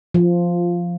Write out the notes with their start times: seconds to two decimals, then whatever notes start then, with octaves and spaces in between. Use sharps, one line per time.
0.14 F3